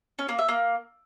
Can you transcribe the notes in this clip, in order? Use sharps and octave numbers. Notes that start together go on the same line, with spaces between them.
C#4
A#3
E5
A#3